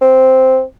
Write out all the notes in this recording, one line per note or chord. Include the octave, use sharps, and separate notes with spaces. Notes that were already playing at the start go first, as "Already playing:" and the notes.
C4